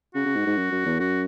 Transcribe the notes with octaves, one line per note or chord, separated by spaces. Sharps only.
C#3 F#4
C#3
G#2
G#2
F#2
F#2
E2
F#2 F#4